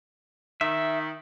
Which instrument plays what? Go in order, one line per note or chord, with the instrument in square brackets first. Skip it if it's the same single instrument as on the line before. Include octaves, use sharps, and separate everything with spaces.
[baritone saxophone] D#3 [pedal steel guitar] E5